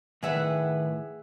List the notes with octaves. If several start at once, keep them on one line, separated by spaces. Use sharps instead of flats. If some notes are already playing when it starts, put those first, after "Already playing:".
A2 D#3 G#4 B4 E5 F#5